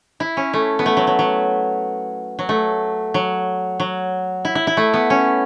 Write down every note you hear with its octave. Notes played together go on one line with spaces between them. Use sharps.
E4
C#4
A3
B3
A3
F#3
F#3
F#3
F#3
A3
F#3
F#3
E4
E4
E4
A3
B3
C#4